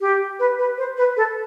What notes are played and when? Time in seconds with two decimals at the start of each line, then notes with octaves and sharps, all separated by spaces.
0.01 G4
0.39 B4
0.59 B4
0.78 C5
0.97 B4
1.17 A4